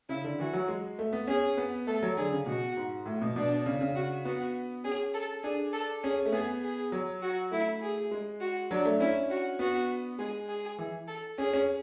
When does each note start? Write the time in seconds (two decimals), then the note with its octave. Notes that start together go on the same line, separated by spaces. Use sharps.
0.09 C#3 E4
0.24 D3
0.39 E3 F#4
0.53 F#3
0.69 G#3
0.99 A3
1.13 B3
1.27 C#4 G#4
1.57 B3
1.87 A3 A4
2.03 F#3
2.17 D3 G#4
2.32 C#3
2.46 B2 F#4
2.77 G#2
3.06 A2
3.22 B2
3.36 B2 D4
3.66 C#3
3.81 C#3
3.96 F#4
4.25 B3 F#4
4.84 C#4 G#4
5.14 A4
5.43 D4 G#4
5.73 A4
6.03 C#4 G#4
6.25 A3
6.32 B3 G#4
6.62 G#4
6.92 F#3
7.22 F#4
7.51 A3 E4
7.82 G#4
8.11 G#3
8.41 F#4
8.71 F#3 D4
8.85 A3
9.00 C#4 E4
9.30 F#4
9.59 B3 F#4
10.19 G#3 G#4
10.49 G#4
10.79 E3
11.08 A4
11.38 C#4 G#4
11.53 C#4